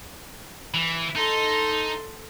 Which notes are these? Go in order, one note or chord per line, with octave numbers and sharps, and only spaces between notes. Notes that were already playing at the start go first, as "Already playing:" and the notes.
E3
D#4 A4 C6